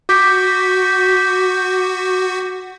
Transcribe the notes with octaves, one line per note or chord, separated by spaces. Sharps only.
F#4 D6 G6 B6